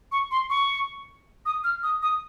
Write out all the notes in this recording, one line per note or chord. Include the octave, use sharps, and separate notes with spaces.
C#6
C6
C#6
D#6
F6
D#6
D#6